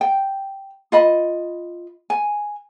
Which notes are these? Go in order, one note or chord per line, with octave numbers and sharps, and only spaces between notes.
G5
F4 D#5 B5
G#5